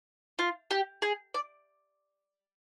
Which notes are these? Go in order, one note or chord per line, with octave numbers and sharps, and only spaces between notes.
F4
G4
G#4
D5